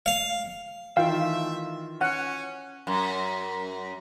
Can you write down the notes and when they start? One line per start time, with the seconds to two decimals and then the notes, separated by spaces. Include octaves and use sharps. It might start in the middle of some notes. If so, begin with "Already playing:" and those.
0.06 F5
0.97 D#3 E3 G3 A3 F4 E5 F5 G5
2.01 C#4 F#5
2.87 F#2